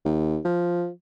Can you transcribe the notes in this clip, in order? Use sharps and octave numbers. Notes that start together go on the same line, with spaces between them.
D#2
F3